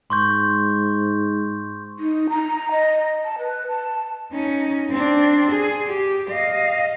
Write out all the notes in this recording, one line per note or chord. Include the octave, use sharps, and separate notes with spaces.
G#2 C6 C#6 G6
D#4
A#5
D#5
A5
B4
A5
C#4 D#4
C4 D4
G#4
G4
D#5 F5